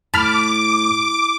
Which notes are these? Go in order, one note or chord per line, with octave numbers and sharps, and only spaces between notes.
A2 A5 B5 D6 F6